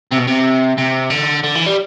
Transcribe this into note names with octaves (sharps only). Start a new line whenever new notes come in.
C3
B2
C3
C3
D3
D3
E3
G3